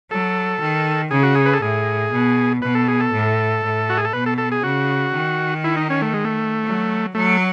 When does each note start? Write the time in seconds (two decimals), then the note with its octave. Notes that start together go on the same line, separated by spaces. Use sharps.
0.11 F#3 A4
0.60 D#3
1.11 C#3 G#4
1.23 F#4
1.35 G#4
1.46 B4
1.53 A4
1.62 A2 G#4
2.11 B2
2.62 B2 B4
2.75 A4
2.88 G#4
3.00 A4
3.13 A2
3.63 A2
3.90 F#4
3.97 G#4
4.05 A4
4.13 B2 B4
4.26 A4
4.38 A4
4.52 G#4
4.63 C#3 F#4
5.14 D#3
5.64 E4
5.77 D#4
5.90 C#4
6.02 A3
6.14 G#3
6.25 A3
6.65 F#3
7.15 F#3 A3